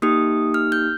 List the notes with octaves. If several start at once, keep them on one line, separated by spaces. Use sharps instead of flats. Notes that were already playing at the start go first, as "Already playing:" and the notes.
A#3 D#4 G4 D#6
F6
G6